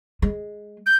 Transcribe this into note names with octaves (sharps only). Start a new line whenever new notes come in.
G#3
G6